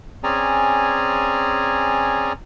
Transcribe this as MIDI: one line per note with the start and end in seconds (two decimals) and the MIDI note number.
0.23 2.33 60
0.23 2.33 61
0.23 2.33 68
0.23 2.33 74
0.23 2.33 80
0.23 2.33 82